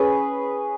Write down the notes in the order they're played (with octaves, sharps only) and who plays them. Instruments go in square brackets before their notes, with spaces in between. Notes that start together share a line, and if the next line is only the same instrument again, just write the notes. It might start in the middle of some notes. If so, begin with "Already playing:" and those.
Already playing: [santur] C#4 G#4 B4